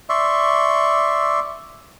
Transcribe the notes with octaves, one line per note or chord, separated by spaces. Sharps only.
D5 E5 C6 C#6